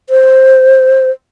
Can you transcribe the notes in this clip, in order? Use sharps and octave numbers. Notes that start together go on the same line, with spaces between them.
C5